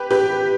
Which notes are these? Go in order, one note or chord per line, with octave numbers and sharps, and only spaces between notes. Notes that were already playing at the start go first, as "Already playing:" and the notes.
Already playing: G4 B4
G4 B4